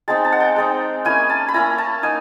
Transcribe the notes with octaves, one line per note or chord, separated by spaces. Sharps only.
G#3 C4 D#4 A5
A5
F#5
G5
G#3 C4 D#4
A#3 C#4 E4 G#5
A5
B5
A#3 C#4 E4 A#5
A5
A#3 D#4 G#5